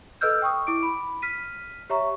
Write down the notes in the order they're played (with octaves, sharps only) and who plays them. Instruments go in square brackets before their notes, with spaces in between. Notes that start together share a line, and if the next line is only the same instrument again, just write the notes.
[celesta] A4 B4 D#5 E6 F6 G6
G5 C#6 D#6
E4 D6 D7
B5
F6 B6 D#7
G4 C#5 E5 A#5 C#6